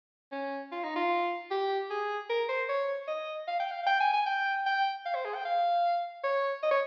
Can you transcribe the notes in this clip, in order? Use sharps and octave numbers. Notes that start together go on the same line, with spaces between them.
C#4
F4
D#4
F4
G4
G#4
A#4
C5
C#5
D#5
F5
G5
F5
F5
G5
G#5
G#5
G5
G5
F5
C5
G#4
G5
F5
C#5
D#5
C#5